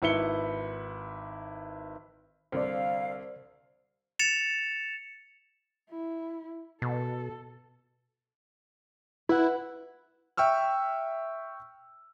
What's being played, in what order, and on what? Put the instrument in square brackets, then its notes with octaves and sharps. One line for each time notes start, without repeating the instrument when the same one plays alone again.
[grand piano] G#1 E4 B4 C#7 G7
[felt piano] C2 D3 [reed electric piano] C5 D5 [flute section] F5
[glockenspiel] A6 C#7 E7 F7
[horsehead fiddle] E4
[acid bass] B2 [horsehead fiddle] A4
[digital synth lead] E4 [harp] B4 F#5
[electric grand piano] E5 G5 C#6 E6 F6